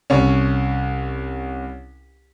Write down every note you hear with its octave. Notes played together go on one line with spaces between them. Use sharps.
C2 C#4